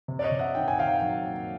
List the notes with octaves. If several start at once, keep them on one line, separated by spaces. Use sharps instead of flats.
C3
D5
C#5 D#5
C3
E5 F#5
D#3 G5
G#5
D#3 F5 G5
F#3
A#3